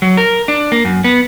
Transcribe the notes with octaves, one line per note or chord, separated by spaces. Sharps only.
F#3
A#4
D4
A#3
F#2
B3